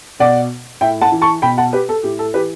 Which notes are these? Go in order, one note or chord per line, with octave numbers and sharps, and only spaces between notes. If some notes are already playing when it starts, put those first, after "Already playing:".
B2 D5 F#5
A2 E5 G5
F#5 A5
E3
A5 C#6
B2 G5 B5
F#5 A5
G4 B4
A4
A2 G4
A4
E3 G4 B4